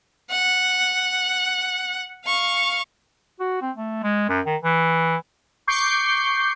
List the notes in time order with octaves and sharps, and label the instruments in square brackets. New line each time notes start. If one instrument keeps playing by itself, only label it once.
[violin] F#5
F5 C#6
[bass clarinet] F#4
C4
A3
G#3
F#2
D#3
E3
[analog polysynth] C#6 D6 G6 C7